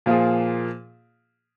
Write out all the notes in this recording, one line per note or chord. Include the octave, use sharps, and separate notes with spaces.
A#2 F3 A#3 F4 G#4